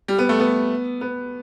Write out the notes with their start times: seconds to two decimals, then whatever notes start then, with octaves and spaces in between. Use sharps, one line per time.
0.08 G3
0.18 B3
0.29 A3
0.39 B3
1.01 B3